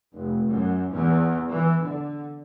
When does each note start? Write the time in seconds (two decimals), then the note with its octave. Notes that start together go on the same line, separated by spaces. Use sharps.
0.13 F1
0.47 F#2
0.92 E2
1.50 E3
1.83 D3